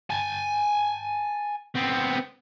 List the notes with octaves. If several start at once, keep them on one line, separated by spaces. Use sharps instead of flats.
G#5 A5
B3 C4